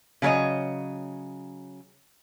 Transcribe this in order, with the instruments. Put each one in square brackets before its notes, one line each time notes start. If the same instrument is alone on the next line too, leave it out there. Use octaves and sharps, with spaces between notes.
[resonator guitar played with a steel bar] C#3 F#3 B3 C#5 D#5